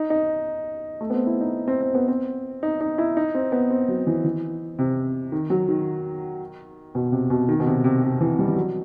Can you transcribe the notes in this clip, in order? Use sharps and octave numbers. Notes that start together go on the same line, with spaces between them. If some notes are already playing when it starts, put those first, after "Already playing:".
Already playing: D#4
D#4
A3
B3
C4
E4
D#4
C4
C4
B3
C4
D#4
D#4
E4
D#4
C4
B3
C4
F#3
E3
E3
C3
D#3
F#3
D#3
B2
C3
B2
D#3
B2
C3
C3
C3
E3
G3
E3
F#3